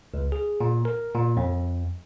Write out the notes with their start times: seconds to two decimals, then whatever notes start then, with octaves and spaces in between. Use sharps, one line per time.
0.14 C#2
0.32 G#4
0.61 A#2
0.85 A#4
1.15 A#2
1.37 F2